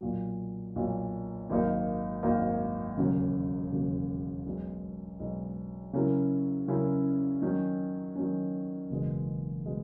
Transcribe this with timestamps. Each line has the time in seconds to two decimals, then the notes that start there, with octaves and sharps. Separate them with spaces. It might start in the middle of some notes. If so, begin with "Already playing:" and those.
0.01 B1 A#2 F#3
0.76 B1 A#2 F#3
1.49 G#1 G#2 F#3 A#3 D#4
2.23 G#1 G#2 F#3 A#3 D#4
2.97 E1 D#2 C#3 F#3
3.72 E1 D#2 C#3 F#3
4.46 B1 B2 G#3
5.20 B1 B2 G#3
5.93 C#3 F#3 C#4 E4 A#4
6.68 C#3 F#3 C#4 E4 A#4
7.42 D#3 F#3 C#4
8.15 D#3 F#3 C#4
8.90 F#1 E2 B2 G#3
9.66 B2 G#3